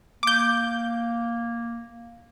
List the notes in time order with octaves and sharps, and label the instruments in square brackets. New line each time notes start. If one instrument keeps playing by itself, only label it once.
[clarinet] A#3 [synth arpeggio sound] D6 G6